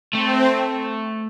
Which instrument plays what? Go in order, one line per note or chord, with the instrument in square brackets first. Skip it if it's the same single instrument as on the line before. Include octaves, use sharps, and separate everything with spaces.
[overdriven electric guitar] A3 [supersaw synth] C4